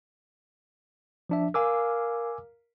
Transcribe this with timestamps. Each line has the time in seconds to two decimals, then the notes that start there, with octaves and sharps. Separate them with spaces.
1.30 F3 D4 E5
1.54 A#4 F5 G#5 D6 E6